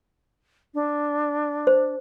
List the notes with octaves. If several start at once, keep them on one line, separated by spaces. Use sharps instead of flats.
D4
C5